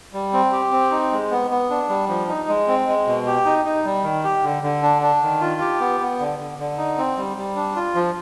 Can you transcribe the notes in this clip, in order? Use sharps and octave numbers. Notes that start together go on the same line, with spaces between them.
G3
C4
G4
C4
D#4
G#3
B3
B3
D4
G3
F3
D#4
G#3
C4
G#3
B2
G4
D#4
D#4
G3
D#3
G4
D3
D3
D4
D4
D#3
F4
G4
B3
B3
D3
D3
D3
D#4
C4
G3
G3
D4
F4
F3